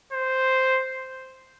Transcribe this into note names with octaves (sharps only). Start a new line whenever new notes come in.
C5